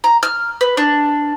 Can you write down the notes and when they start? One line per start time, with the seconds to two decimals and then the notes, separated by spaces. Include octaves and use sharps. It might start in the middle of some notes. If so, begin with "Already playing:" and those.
0.04 A#5
0.23 F6
0.61 B4
0.77 D4